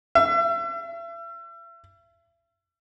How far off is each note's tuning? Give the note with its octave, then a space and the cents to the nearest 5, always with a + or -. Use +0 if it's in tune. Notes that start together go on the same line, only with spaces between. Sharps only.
E5 +40